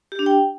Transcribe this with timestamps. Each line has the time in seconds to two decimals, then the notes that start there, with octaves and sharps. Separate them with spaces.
0.12 G4
0.19 D4
0.26 G5